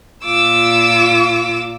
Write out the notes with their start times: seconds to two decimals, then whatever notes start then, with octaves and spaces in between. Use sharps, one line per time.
0.25 A#2 F4 D6 E6